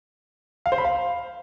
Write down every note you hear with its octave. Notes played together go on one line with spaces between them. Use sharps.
F5
C5
B5
F5